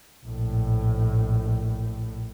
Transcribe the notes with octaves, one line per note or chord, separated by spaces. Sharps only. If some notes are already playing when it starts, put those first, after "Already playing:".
A#1 A2